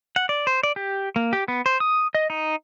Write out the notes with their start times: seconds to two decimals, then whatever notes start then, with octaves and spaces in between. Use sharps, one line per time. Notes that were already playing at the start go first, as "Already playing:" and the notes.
0.16 F#5
0.29 D5
0.47 C5
0.63 D5
0.76 G4
1.16 A#3
1.33 G4
1.48 B3
1.66 C5
1.80 D#6
2.15 D#5
2.30 D#4